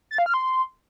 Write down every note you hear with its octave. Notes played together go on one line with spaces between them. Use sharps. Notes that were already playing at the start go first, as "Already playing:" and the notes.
A6
F5
F6
C6